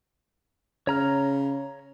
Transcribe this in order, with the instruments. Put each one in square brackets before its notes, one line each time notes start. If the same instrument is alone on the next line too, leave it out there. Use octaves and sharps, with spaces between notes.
[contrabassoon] C#3 [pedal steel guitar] C#5 A#5 F6